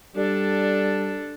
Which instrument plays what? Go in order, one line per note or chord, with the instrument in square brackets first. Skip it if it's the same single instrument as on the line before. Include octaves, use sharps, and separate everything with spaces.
[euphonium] G3 [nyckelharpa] D4 A4